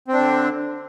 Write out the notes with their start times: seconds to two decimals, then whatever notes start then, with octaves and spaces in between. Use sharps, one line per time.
0.08 C4
0.13 D4
0.18 D3